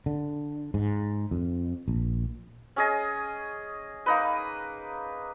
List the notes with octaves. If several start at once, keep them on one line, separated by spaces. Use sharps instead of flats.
D3
G#2
F2
A#1
C#4 G#4 D#5
A#3 D#4 B4